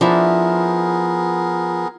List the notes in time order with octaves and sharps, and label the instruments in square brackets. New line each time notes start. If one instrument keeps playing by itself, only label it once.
[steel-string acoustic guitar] F3 [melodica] B3 G#4 A#4 [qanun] D4 E4 E5